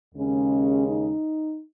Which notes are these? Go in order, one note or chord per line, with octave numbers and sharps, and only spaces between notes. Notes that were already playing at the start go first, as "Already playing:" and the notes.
D#2 C#3 G#3 C#4
D#4